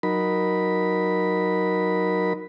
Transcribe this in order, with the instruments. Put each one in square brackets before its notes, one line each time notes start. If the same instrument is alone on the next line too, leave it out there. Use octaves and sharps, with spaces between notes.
[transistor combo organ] F#3 D#4 A#4 B5